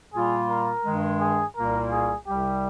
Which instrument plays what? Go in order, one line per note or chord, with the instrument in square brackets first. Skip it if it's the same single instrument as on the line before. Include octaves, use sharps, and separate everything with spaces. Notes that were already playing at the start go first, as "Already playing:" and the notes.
[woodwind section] A#2 G3 A#3 F4 [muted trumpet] G#4
[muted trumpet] A#4
[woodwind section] G2 D#3 G#3
[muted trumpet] G#4
[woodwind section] C2 A#2 G3 A#3 F4 [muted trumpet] A#4
[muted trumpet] G#4
[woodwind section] C2 C3 G3 [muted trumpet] G4